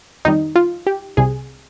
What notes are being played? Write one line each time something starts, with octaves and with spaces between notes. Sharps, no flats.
F2 D#3 G3 D#4
F4
G4
C2 C3 G3 G#4